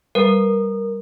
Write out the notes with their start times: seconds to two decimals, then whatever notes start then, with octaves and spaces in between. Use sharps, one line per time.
0.15 G3 A#4 B4